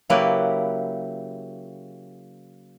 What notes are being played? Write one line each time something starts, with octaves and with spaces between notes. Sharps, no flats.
C#3 F#3 A#3 E4 G4 B4